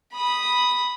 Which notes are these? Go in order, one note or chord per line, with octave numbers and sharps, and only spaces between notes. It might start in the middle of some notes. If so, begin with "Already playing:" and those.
B5 D#6